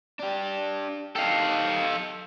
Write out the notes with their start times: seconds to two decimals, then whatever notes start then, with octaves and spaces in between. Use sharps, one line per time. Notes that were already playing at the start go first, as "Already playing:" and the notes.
0.20 D4 G4
1.16 D#4 G4 A4 F5